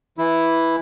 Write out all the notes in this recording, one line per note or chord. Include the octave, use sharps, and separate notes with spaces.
E3 E4